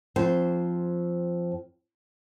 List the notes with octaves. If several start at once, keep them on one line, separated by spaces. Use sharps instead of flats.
F2 C5